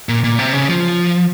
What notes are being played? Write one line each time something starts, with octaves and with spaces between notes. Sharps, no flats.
A#2
A#2
C3
C#3
F3